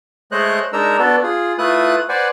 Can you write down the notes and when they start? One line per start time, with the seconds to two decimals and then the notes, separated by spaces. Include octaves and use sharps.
0.32 G#3 A3 C5 C#5 D#5 F#6
0.73 G#3 D4 D#4 A#4 A#5 E6
0.99 B3 D4 F#4 A4
1.23 F4 G#4
1.58 A3 E4 F4 B4 D#6 F#6
2.09 B4 C5 D5 F#5 G#5